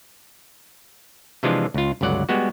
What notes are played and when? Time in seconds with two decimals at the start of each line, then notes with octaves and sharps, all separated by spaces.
1.43 C3 E3 F3 G#3 D4 F4
1.74 C#2 F4
2.01 G1 C#2 F#3 D5 F#5
2.29 G3 G#3 B3 F#4